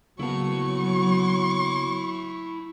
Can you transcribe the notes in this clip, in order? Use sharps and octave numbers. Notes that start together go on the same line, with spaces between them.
C#3 F#3 A#3 B3 E4 A5 C#6